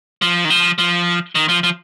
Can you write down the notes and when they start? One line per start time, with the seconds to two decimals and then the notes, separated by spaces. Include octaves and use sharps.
0.22 F3
0.45 D#3
0.50 F3
0.78 F3
1.35 D#3
1.49 F3
1.63 F3